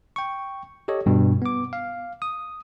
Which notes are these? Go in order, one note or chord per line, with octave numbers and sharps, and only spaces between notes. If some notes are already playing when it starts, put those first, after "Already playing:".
G5 C#6
G4 A4 C#5 D#5
G2 B2
B3 D6
F5
D#6